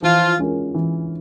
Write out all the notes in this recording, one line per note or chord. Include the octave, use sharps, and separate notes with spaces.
E3 F3 F4
G#3 C#4 F4 A#4
E3